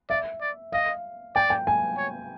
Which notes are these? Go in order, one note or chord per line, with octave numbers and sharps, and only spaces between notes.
D5 E5
D5
D#5 F5
D5 G5
G5
G#5
C#5